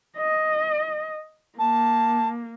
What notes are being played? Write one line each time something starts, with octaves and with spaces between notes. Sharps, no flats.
D#5
A#3 A5